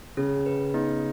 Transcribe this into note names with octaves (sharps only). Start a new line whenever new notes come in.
C#3 C#4
B4
B3 D#4